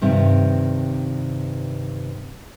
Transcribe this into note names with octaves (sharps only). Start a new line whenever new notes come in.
G2 C3 D#3